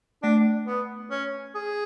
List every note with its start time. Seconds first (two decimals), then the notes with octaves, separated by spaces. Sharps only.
0.23 A3 D4
0.67 B3
1.11 C#4
1.55 G#4